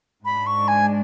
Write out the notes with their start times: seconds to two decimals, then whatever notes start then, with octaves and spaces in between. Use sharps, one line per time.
0.25 G#2 G#3 D4 B5
0.47 C#6
0.68 G#5